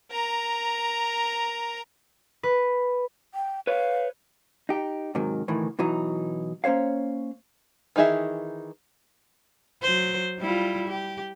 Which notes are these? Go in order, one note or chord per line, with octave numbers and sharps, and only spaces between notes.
A#4 A#5
B4
G5
B4 C#5 F5
D#4 G4
G#2 C3 D#3 F#3
D2 A2 D#3 E3
B2 E3 F#3 D#4
A#3 C#4 C5 C#5 F5
D#3 E3 D#4 G#4 E5
F#3 C5
G3 E4 F4
G4